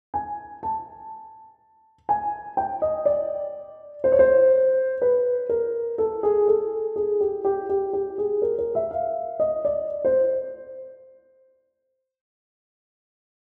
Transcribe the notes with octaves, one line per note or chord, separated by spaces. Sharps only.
G#5
A5
G#5
G5
D#5
D5
C5
C#5
C5
B4
A#4
A4
G#4
A4
G#4
G4
G4
G4
G4
G#4
A#4
A#4
E5
F5
D#5
D5
C5